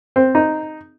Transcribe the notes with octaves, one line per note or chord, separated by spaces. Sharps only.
C4
D#4